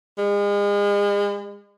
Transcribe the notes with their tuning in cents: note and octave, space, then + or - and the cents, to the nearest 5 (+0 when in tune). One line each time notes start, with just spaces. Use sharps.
G#3 -40